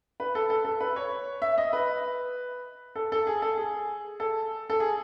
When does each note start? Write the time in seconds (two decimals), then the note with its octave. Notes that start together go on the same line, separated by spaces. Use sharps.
0.20 B4
0.35 A4
0.50 A4
0.65 A4
0.80 B4
0.96 C#5
1.42 E5
1.58 D#5
1.73 B4
2.95 A4
3.12 A4
3.27 G#4
3.42 A4
3.58 G#4
4.20 A4
4.70 A4
4.80 G#4